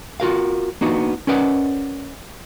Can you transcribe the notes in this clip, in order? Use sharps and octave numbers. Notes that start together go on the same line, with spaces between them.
F4 F#4 A#4 F5
A#3 B3 D4 D#4 F#4
C#4 A#4 B4 D5 D#5 F#5